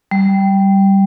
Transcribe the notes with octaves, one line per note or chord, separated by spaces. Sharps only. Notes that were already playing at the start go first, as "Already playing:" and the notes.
G3